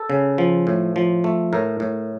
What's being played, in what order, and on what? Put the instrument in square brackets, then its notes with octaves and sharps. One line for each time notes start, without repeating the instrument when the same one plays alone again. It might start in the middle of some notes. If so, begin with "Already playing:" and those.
Already playing: [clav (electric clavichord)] A4
C#3
F3
A2
F3
A3
A2 A#4
A2